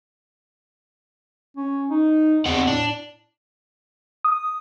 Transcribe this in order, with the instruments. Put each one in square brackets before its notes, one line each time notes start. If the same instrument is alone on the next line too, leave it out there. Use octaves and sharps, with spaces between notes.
[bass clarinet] C#4
D#4
[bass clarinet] E2 [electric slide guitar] C4 D#5 F#5
[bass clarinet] A2 [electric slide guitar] D4
[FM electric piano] D#6